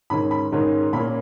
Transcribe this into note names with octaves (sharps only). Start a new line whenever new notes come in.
G#2 D#3 G#3 C#4 B5
B5
G#2 D#3 G#3 C#4
A#2 A#3 C#4 B5